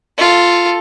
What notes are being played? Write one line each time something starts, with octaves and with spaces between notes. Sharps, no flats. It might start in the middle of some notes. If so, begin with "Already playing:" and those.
F4 A4